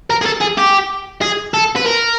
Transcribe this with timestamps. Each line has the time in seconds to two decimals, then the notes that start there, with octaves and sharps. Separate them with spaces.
0.10 A#4
0.22 G#4
0.26 A4
0.41 G#4
0.58 G4
1.21 G#4
1.54 A4
1.76 B4
1.86 A#4